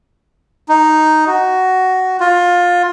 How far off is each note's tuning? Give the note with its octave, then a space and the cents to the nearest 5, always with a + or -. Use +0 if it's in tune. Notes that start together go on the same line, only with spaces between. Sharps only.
D#4 +0
F#4 +10
F4 +20